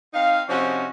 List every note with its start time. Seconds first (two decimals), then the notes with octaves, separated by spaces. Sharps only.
0.14 C4 D#4 F5
0.48 C3 F3 C#4 D#4 F#4